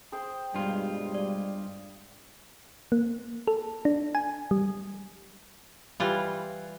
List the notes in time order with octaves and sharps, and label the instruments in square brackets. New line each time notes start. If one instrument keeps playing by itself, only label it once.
[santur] G#4 C5 G5
[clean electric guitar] G2 F4 [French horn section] B2 G3 G#3 [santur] G#5
[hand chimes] D5
[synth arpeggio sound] A#3
A4
D4
G#5
G3
[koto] E3 G3 F4